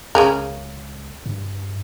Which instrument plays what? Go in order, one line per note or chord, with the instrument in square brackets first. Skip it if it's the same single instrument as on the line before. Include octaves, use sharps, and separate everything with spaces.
[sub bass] C#2 [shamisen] C#3 G#4 A#4
[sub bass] G2